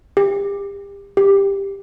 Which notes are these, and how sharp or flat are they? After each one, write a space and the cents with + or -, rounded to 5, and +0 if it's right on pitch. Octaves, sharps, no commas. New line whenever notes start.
G4 +35
G4 +15